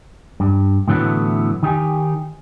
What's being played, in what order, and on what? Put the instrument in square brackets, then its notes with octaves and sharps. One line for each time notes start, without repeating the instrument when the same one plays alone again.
[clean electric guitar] G2
A2 D3 E3 F#3 A3 B3
D#3 D#4 G4 G#5